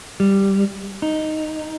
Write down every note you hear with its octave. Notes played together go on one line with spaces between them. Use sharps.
G3
D#4